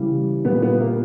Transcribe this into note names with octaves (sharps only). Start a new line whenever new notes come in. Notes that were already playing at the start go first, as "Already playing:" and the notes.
Already playing: C#3 E3 G3
A#2 G3 B3
B3
A#3